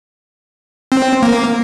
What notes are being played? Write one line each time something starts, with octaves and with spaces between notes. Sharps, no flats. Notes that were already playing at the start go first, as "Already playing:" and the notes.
C4
A#3